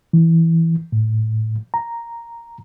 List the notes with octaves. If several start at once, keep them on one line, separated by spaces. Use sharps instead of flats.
E3
A2
A#5